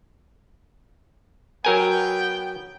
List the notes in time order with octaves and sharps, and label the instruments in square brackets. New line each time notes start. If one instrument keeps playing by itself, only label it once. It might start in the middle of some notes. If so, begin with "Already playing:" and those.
[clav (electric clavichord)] F#3 A#4 G#5 [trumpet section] B3 G5